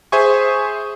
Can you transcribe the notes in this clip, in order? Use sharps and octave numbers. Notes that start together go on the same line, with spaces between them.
G#4 C5 E5 G#5 C#6